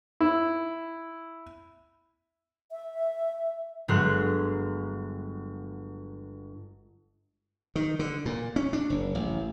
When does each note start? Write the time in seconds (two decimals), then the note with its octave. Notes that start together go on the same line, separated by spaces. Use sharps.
0.20 E4
2.71 E5
3.88 G1 F#3 G#3 C6 F#6
7.76 D#3
7.99 D3
8.26 A#2
8.56 C#4
8.73 D4
8.90 F#1
9.15 A1